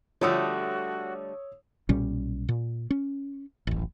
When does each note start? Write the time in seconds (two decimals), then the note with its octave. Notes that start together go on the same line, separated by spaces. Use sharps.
0.21 D3 F3 G3 A3 F#4 C#5 D#6 E6
1.89 B1 A#2 G3 C#4
2.49 A#2
2.90 C#4
3.67 D1 A1